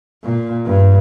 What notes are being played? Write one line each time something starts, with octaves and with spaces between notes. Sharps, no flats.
A#2
G2